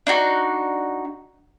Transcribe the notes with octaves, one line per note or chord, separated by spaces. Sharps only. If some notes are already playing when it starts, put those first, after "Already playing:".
D4 D#4 F#4